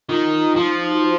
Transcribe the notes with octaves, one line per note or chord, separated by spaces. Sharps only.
D#3 F4
F3 D#4
F4
D#4
F#4
C5